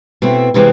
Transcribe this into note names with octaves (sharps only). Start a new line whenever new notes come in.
B2 A3 C4 E4
C3 E3 G#3 C4 E4